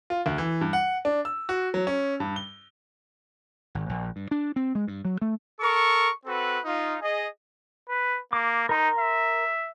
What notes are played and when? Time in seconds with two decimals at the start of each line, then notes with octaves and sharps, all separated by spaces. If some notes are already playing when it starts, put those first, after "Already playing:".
0.10 F4
0.26 D2
0.38 E3
0.61 G2
0.73 F#5
1.05 D4
1.25 E6
1.49 F#4
1.74 F#3
1.87 C#4
2.20 G2
2.36 G7
3.75 G#1
3.89 A#1
4.16 G2
4.31 D4
4.56 C4
4.75 G#3
4.88 G2
5.05 F#3
5.22 A3
5.60 A4 A#4 C#6
6.26 C4 F#4 A4 B4
6.65 D#4 F4
7.01 G#4 D#5
7.89 B4
8.33 A#3 D6
8.69 D#4 A#4 A#5 C6
8.99 E5